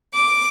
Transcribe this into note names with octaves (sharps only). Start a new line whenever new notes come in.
D6